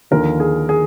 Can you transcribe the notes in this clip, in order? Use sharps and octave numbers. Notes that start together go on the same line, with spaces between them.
D#2 D3 F3 A#4
G#4
G#4